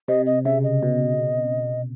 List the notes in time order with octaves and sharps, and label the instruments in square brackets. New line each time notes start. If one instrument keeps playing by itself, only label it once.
[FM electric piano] C3 [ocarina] D#5
[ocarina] D#5
[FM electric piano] C#3 [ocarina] E5
[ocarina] D#5
[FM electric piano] B2